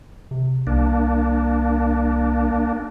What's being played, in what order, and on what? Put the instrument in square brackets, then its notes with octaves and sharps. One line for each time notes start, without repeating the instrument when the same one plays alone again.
[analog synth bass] C3
[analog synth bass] C2 [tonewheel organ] A#3 D4